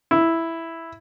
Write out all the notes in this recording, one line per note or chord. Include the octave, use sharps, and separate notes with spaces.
E4